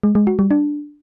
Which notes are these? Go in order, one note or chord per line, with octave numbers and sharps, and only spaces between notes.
G#3
G#3
F#4
G3
D4